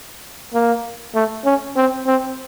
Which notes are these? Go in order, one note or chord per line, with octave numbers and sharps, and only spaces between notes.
A#3
A3
C#4
C4
C4